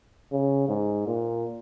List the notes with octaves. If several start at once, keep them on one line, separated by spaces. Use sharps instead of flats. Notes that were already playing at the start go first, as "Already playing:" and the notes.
C#3
G#2
A#2